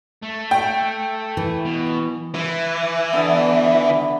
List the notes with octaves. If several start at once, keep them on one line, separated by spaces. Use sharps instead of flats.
A3
G5
E3
B2
E3
D3 B3 E5